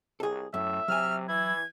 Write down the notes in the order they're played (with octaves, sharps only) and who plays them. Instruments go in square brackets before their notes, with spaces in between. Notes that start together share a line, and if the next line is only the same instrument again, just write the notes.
[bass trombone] C2 [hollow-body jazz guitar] G#4 A4
[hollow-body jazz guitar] F#2 [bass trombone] A2 [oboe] E5
[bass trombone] C3 [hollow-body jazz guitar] F#3 G#5 [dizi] F6
[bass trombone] E3 [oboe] E4 [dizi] G#6